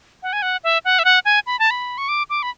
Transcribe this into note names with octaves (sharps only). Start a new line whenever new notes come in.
F#5
G#5
F#5
E5
F#5
E5
F#5
G#5
B5
A5
B5
C#6
D6
D6
B5